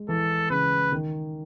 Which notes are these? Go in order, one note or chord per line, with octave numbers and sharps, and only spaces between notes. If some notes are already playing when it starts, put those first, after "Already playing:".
Already playing: G#3
E3 A4
C#3 B4
D#3